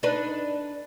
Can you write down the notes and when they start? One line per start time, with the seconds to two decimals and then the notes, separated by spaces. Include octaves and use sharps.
0.03 D4 D#4 B4